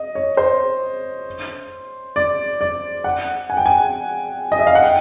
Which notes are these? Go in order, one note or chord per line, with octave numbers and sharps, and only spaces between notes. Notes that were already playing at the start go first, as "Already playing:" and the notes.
Already playing: D#5
C#5
C5
D5
D5
F#5
G#5
G5
G#5
D#5
E5
F5
F#5
G5